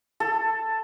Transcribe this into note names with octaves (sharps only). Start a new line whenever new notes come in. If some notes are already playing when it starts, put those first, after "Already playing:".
A4